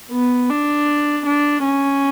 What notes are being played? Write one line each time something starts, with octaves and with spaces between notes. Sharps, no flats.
B3
D4
D4
C#4